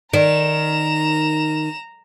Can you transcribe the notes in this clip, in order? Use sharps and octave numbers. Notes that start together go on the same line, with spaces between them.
D#3 D5 A#5 E7